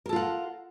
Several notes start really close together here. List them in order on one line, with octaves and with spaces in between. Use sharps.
A#4 A4 F4 F#5